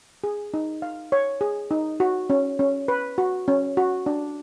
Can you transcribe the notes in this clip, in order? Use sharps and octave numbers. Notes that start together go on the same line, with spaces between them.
G#4
D#4
F5
C#5
G#4
D#4
F#4
C#4
C#4
B4
F#4
C#4
F#4
D4